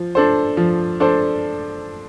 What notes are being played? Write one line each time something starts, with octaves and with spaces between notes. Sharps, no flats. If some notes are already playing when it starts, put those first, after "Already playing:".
Already playing: F3
D4 A4 C5
F3
D4 A4 C5